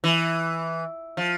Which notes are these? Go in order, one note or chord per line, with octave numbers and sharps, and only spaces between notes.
E3
F3